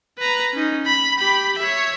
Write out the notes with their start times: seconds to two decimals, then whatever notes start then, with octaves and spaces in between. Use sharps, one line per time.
0.19 B4 A#5
0.54 C#4 D#4
0.86 B5
1.19 G4 B5
1.58 C#5 E5